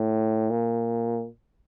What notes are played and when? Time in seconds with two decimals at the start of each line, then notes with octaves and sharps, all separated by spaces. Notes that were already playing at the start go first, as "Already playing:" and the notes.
Already playing: A2
0.50 A#2